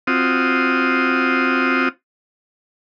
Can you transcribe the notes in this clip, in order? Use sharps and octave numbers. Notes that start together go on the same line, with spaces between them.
C4 F4 F#4 D#6